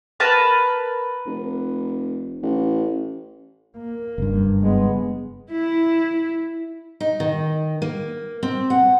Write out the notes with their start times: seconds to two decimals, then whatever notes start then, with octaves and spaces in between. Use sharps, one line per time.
0.20 A#4 B4 A5
1.27 F1
2.43 A1
3.77 A#3
4.18 F#1 G2
4.62 G#3 B3
5.51 E4
7.00 D#4
7.20 D#3
7.82 A#3
8.43 C4
8.70 F#5